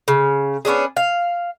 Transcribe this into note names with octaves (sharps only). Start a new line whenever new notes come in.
C#3
B3 C#4 D4 G#4
F5